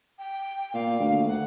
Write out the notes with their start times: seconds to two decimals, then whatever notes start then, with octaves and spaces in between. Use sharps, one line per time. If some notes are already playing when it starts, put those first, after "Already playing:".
0.19 G5
0.74 A#2 F5
1.00 D2
1.27 D2 F#5